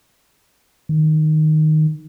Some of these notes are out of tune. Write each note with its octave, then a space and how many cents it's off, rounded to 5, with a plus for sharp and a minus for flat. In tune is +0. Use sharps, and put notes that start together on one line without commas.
D#3 -5